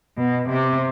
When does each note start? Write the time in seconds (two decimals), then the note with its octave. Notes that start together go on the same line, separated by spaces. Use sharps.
0.18 B2
0.49 C3